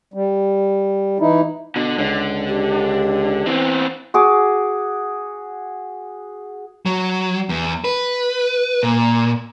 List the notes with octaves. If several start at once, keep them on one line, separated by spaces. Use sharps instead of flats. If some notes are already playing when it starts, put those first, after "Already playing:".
G3
E3 D#4 E4
B2 D3
C#2 D3
G4
E3 B3 C4
F#4 G#4 D6
F#3
E2
B4
A#2